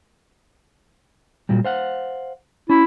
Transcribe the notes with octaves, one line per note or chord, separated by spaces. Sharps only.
A#2 F#3 G3
C5 F5 F#5
C#4 E4